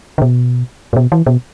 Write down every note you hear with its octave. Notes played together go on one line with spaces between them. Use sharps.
D3
B2
A2
B2
E3
B2